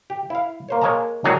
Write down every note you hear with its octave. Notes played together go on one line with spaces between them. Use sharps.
G4
E4 F5
A#3 C5 C#5
G#3 A#3 C#5 D#5 A5 A#5
C2 A2 F#3 F#4 G#4 A#5